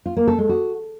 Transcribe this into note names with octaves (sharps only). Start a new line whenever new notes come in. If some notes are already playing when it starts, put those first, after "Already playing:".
F4
A#3
A4
G#3
F#4